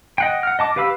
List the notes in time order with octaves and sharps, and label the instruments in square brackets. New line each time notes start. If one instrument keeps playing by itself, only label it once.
[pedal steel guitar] D#5 F#5 G5
F#5 F6
D#5 A5 D6
G4 B4 F5 B5 E6